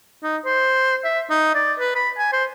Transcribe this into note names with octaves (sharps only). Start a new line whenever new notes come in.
D#4
C5
E5
D#4
D5
B4
B5
G#5
C5